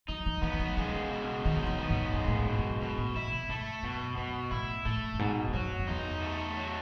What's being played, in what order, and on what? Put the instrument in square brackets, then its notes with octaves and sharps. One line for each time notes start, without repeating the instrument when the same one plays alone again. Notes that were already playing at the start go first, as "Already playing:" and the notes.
[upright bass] F#3 [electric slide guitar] D#4
[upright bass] E3
[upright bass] E3 [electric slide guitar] B3
[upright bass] F#3
[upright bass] C#3 [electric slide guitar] G#3
[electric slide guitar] B2
[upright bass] D#3 [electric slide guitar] D#4
[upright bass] E3
[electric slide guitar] B3
[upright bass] G#2
[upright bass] F#2 [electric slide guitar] G#3
[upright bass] A2
G#2
[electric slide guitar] B2
[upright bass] F#2
[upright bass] F#2 [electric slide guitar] B2
[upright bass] A2
[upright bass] G#2 [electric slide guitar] E4
[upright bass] B2
[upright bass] G#2 [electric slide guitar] A3
[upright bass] F#2 [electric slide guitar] B2
[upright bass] F#2 [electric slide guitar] B2
[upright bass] A2 [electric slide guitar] E4
[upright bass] A2 [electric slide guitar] A3
[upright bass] F#2
[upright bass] G#2 [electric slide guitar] B2
[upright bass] G#2
[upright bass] F#2 [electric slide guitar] F#3
[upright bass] F#2
[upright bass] E2 [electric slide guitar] D#4
[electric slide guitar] A3
F#3